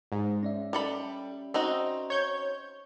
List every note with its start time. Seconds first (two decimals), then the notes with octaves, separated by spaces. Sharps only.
0.12 G#2
0.43 C#4 D5 E5
0.73 G3 A4 B5
1.54 C4 D#4 F#4
2.10 C#5 G6 G#6